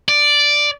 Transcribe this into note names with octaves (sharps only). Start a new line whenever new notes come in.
D5